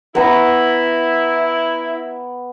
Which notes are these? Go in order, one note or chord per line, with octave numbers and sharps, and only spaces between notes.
B3 E4 A#5 C#6